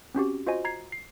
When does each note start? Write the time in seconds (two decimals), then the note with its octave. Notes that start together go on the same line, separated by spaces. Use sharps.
0.15 C4 C#4 F#4 G4
0.47 F4 F#4 C5 D#5 G#5
0.65 A#5 G#6 C7
0.92 C7